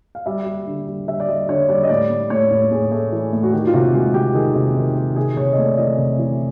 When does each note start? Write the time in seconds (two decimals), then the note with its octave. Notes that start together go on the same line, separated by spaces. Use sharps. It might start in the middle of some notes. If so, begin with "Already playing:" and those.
0.15 F5
0.26 G3 E5
0.46 G3
0.67 D3
0.87 G3
1.07 G3 E5
1.20 D5
1.28 G3 D#5
1.49 D3 C#5
1.68 G3 D5
1.83 D#5
1.89 A2 D5
2.10 A2
2.30 A2 C#5
2.51 A2
2.71 A2 G#4
2.92 A3
3.12 E3
3.33 A2
3.43 F#4
3.53 D#3 G4
3.67 F4
3.74 C3 F#4
3.94 G#3 F#4
4.14 C3 G4
4.34 D#3 G#4
4.55 C3
4.76 D#3
4.96 D#3
5.16 C3 G#4
5.37 C3 C#5
5.53 D#5
5.58 A3 D5
5.74 D5
5.78 E3 D#5
5.98 C3
6.19 E3